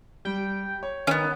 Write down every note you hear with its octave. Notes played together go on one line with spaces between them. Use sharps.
G3 G5
C#5
D#3 B3 C#4